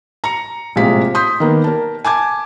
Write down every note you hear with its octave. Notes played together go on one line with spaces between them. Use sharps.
A#5 C#7
A#1 A2 C3 G#3 F5 B6
C6 D#6 G6 B6
D#3 A#3 B3
A#4 A5
G#5 A5 D6 G#6